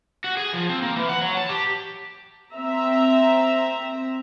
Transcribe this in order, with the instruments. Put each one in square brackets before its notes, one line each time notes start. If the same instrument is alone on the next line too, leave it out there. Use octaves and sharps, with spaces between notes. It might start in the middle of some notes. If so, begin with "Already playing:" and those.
[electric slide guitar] F#4
G#4
F3
C4
A#3
E3
F#5
F#3
A5
G4
[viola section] C4 E5 A#5